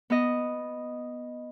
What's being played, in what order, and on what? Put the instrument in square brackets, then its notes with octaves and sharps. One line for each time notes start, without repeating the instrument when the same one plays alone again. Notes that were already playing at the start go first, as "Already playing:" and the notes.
[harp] B3 D#5